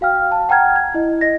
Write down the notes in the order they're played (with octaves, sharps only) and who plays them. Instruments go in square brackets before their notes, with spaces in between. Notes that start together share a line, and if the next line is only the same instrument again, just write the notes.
[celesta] F#4 F5 G5 F6
A5
F#5 G5 A#5 F6 G#6
G#6
E4 D#5
D#5 A#6